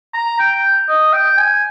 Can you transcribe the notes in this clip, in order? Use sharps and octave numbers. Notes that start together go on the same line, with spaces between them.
A#5
G5
D#5
G5
G#5